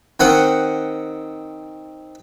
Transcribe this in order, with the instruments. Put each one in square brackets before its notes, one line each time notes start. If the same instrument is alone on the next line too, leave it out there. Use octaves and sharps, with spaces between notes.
[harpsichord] D#3 C4 F#5 D#6